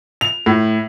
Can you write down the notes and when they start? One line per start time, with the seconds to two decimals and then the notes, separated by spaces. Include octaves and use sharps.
0.21 F7
0.46 A2